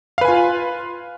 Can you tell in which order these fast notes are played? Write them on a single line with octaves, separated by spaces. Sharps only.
F5 B4 G#5 F4